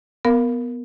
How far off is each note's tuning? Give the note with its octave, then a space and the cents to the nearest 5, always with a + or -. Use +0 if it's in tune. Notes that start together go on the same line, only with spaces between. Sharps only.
B3 -5 A#4 +0 F5 +0